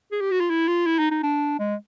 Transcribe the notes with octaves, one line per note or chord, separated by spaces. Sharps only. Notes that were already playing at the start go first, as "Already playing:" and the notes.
G#4
G4
F#4
F4
E4
F4
E4
D#4
D#4
D4
G#3